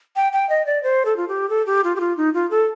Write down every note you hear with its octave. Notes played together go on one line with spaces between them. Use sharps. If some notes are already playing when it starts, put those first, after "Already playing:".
G5
G5
D#5
D5
C5
A4
F4
G4
A4
G4
F4
G4
F4
D#4
F4
A4